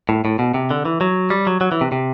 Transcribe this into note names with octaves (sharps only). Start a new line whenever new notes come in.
A2
A2
B2
C3
D3
E3
F#3
G3
F#3
F#3
E3
C3
C3